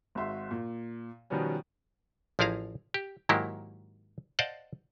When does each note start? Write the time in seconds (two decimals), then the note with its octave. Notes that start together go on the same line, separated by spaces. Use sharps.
0.15 G#1 G#2 F#4 E5 C6
0.51 A#2
1.30 B2 D#3 F3 G3 B3 C#4
2.39 A1 F3 E4 G#4 F5 A#5
2.94 G4
3.29 G#2 D#3 F#3 A#3 E4 G4
4.39 C5 D5 D#5 F5 F#5 A5